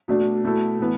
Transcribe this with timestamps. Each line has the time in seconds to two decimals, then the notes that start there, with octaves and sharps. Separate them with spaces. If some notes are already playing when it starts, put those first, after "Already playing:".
0.08 B2 A3 D4
0.44 B2 A3 E4 A4
0.80 A2 E3 B3